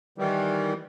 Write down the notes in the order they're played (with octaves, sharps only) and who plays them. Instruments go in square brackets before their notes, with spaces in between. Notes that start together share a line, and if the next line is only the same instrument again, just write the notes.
[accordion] D#3 E3 G3